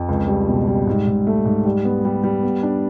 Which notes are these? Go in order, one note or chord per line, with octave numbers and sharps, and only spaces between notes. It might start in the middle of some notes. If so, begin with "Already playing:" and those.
Already playing: F2
C#2
G3
B2
G3
G#2
G#2
A3
G#2
G3
B3
G3
G3
B3
D4